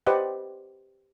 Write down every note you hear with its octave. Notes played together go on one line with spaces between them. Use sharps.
G4 B4 C5 D5 D#5 F#5